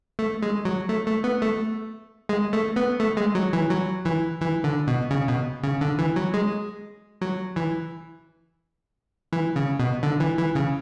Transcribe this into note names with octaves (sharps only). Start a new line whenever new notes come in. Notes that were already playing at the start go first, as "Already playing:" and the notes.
A3
G#3
F#3
A3
A3
B3
A3
G#3
A3
B3
A3
G#3
F#3
E3
F#3
E3
E3
D3
B2
C#3
B2
C#3
D3
E3
F#3
G#3
F#3
E3
E3
C#3
B2
D3
E3
E3
C#3